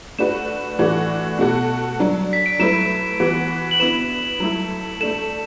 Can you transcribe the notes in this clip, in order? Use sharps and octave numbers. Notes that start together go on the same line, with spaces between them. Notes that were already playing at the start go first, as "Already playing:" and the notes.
A3 D4 F#4 B4 E7
A2 E3 D4 F#4
B2 A3 F#4 A4
D3 F#3 D4
B6
D7
F#3 A3 E4 B4 E7
E3 B3 F#4 B4
F#7
D3 B3 E4 B4 E7
F#3 A3 E4 A4
A3 D4 A4 E7